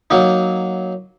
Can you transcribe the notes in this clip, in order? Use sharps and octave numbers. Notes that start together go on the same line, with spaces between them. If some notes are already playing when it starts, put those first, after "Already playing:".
F#3 A#3 D#4